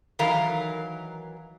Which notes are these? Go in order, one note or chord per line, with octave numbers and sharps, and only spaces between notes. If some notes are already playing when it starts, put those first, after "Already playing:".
D#3 E3 F#3 A#4 F5